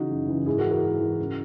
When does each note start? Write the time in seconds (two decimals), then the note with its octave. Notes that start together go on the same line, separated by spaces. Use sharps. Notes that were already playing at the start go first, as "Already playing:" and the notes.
Already playing: C#3 E3 D#4 F#4
0.10 F#2
0.28 C#3 E3
0.46 G#2 E4 G#4
0.58 F#4 A#4
0.64 E3
0.71 F#4 A#4
0.83 G#2
1.00 E3
1.19 C#2